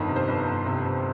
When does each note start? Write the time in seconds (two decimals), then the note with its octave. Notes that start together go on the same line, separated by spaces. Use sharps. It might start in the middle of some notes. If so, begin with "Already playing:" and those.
Already playing: G1 F2 D#3
0.08 C3
0.16 C5
0.28 G1 B4
0.48 G1
0.66 C3
0.85 C3